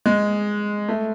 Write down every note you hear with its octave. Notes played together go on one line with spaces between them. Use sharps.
G#3
A3